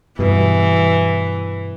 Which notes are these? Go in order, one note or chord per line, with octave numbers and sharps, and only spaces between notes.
G2 B2 E3